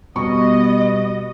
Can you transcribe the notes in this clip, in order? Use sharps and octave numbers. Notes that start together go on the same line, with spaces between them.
B2 G3 B3 D#5 C#6